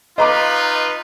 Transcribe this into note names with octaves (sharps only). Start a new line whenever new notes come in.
D#4 F4 B4 D#5 A#5 D6